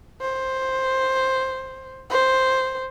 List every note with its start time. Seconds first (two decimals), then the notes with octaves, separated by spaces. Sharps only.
0.21 C5
2.10 C5